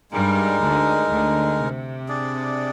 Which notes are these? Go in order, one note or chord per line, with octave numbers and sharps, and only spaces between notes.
G2 G3 G#3 D#4 A#4
D2 D3
D2 D3
C3
D4 G#4 D5